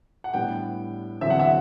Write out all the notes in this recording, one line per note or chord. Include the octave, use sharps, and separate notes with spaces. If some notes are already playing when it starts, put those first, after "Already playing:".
F#5
A2 G3 B3 D4 G5
E2 D3 F#3 C4 E5
F#5
E5